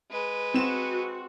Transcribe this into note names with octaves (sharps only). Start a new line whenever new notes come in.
G#3 B4
C4 F#4 E7